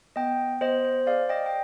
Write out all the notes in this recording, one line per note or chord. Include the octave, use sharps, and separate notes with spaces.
B3 D#5 G5
B3 C5 D#5
C5
G#4 D5 F5
D#5 G5
G5